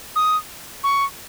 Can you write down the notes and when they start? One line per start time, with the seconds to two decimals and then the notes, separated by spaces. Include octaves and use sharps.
0.16 D#6
0.84 C#6